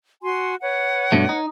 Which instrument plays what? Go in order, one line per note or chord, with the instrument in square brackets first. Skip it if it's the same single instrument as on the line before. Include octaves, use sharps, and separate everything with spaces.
[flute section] F#4 G#5 C6
B4 C#5 F#5
[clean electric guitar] G2 B2 A3
D#4